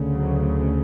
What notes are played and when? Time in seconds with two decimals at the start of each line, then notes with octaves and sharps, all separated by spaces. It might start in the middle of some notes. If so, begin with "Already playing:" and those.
Already playing: D2 C#3
0.16 F#3